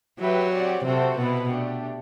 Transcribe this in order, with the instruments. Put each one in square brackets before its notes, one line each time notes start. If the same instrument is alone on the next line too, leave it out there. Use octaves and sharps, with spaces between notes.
[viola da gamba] F#3 [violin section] G4 B4 E5 G5
[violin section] C4 G4 D5 F#5
[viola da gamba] C3 [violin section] C4 F#4 A4 C5 E5
[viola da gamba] B2 [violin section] E4 B4 F#5
[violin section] A3 D4 G4